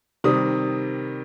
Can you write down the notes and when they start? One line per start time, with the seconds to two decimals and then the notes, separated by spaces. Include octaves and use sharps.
0.24 C3 D#3 G3 D#6